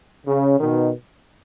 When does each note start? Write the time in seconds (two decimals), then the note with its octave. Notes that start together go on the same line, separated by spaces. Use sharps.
0.27 C#3
0.60 B2 D#3